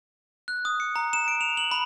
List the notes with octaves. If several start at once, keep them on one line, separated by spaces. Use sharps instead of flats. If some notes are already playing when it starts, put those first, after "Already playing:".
F#6
D#6
C#7
A#5
E7
D7
F7
F#7
B5